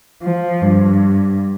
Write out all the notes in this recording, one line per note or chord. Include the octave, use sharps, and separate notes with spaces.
F3
G2